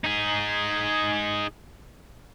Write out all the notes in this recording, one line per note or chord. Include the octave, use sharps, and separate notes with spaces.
D#4 G#4